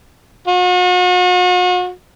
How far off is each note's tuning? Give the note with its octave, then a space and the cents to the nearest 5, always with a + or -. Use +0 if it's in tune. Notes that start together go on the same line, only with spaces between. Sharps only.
F#4 -40